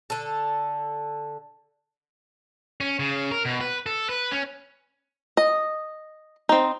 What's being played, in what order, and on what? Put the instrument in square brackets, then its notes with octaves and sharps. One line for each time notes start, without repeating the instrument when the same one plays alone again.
[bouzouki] D3 A4
[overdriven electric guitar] C#4
C#3
A#4
B2
B4
A4
B4
C#4
[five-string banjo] D#5
C4 D#4